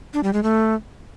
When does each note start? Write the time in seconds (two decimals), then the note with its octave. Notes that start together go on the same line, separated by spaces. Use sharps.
0.14 D4
0.23 G3
0.33 G#3
0.43 A3